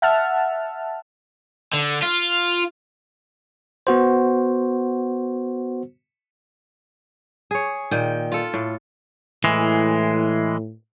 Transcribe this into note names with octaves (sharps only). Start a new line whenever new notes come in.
E5 F#5 A5 F6
D3
F4
B3 F#4 C5
G#4 C#5
A#2 D#3 G5
F4 A4
A2
A2 E3 G#3